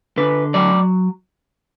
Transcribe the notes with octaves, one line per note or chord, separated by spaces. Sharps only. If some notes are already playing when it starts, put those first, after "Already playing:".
D3 B4
F#3 D5